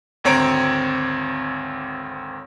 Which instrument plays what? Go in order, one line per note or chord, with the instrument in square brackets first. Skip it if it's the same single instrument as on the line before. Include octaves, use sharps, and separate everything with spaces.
[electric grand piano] G#1 D2 C4 C#5 A#5 D7